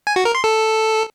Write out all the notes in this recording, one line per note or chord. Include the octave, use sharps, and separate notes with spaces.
G#5
F#4
A#4
C6
A4